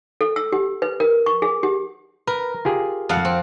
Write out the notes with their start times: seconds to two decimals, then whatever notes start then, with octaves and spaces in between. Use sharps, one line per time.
0.21 A4
0.36 E6
0.52 G4
0.82 B4
1.00 A#4
1.26 C#6
1.42 G#4
1.63 G4
2.27 A#4 B4
2.65 F4 G4 G#4
3.09 F2 F5 F#5
3.25 C4